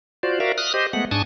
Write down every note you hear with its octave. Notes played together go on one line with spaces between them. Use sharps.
F4 F#4 C5 D5
F#4 A#4 D5 E5 F5
D#6 F6 F#6
G4 C5 D#5
G#3 A3 B3 F#5
G#2 D4 G#5 A5 C#6 D#6